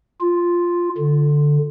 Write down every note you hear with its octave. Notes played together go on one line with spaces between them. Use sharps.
F4
D3